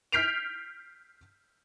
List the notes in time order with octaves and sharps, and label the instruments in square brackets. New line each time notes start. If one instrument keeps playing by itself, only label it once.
[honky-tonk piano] F6 G6 B6 C7 D7 F7